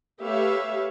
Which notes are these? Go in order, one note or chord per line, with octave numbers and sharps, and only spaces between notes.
A3 G4 B4 C#5 E5 F5